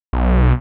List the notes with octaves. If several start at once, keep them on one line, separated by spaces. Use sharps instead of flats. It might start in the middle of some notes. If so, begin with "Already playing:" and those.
B1